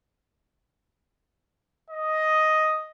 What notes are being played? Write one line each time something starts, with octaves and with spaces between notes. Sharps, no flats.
D#5